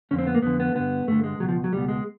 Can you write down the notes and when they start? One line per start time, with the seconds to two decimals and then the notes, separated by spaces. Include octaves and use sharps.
0.11 F2 D3 C#4
0.18 C4
0.27 B3
0.35 A#3
0.42 F2 D3 B3
0.60 B3
0.75 G2 D3 B3
1.07 G2 D3 A3
1.24 G#3
1.40 C#2 B2 F#3
1.48 F3
1.64 F#3
1.73 C#2 B2 G3
1.88 G#3